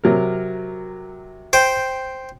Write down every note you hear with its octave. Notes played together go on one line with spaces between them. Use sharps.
C3 F#3 A#4
C5 G5